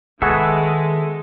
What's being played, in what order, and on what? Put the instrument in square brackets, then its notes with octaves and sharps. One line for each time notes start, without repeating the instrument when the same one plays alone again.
[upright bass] D#3 [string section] G#3 [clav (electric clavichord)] B3 F#4 G#4 [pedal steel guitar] A4 E5